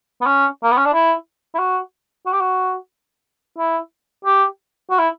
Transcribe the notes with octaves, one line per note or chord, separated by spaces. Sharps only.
B3
C#4
A#3
B3
C#4
D4
E4
E4
F#4
F#4
G4
F#4
E4
G4
F#4
E4